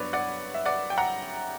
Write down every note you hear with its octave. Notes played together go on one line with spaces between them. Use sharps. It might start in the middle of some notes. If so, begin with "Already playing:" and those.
Already playing: G2 F#3 B3 B4 C#5 D5
D5 F#5
E5
D5 F#5
G5
F#5 A#5